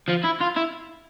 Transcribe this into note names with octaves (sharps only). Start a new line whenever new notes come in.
F3
E4
F4
E4